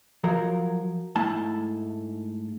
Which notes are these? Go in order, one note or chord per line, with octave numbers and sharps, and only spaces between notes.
F3 F#3 A#4
G#2 A3 E4 A5